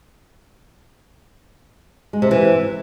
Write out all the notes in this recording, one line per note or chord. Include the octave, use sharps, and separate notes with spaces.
G#3
C3
E3